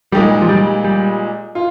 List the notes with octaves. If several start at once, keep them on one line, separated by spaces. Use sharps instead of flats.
A#2 G3 G#3 D#4 G4
F3
G3
G3
F4